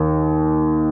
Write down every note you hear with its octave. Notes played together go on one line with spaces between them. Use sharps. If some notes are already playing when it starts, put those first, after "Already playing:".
Already playing: D#2 D#3